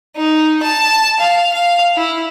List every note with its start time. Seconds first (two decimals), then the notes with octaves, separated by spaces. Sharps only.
0.16 D#4
0.62 A5
1.19 F5
1.53 F5
1.96 E4